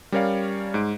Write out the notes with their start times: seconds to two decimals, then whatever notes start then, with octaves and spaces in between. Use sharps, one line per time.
0.12 G3 C#4 A#4 C#5 D5 F5
0.74 G#2 G#3 D7